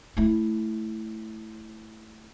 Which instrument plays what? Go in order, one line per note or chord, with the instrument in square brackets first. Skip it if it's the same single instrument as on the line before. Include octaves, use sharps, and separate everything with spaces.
[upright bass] A3 E4